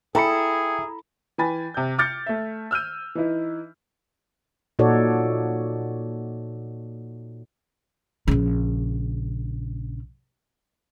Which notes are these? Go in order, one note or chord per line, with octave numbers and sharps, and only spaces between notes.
E4 G#4 A4 G5 A#5 B5 C#7
E3 G5 G#5 B5 A6
C3 G6
D6 F6 G6 A6 C#7
A3 E5
E6 F6 G6 D#7
E3 D#4 E4
A#2 D#4 F#4 A4 C#5 D5
A#1 C#3